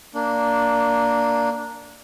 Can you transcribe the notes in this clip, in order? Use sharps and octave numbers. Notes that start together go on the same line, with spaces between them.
A#3 D4